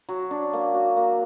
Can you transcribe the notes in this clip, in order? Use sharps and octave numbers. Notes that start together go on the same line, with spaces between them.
F#3
D4
A#3
F#4
A#3